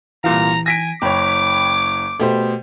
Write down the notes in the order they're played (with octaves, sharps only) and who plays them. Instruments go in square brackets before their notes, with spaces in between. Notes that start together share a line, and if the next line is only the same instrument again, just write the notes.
[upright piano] C2 A#2 F5 [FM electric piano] E3 [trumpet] A#5
[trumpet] G#5 [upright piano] A#6 B6 D7
[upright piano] F#1 C#5 [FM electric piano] G5 B5 [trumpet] D6
[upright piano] B2 G4 C5 [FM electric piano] A3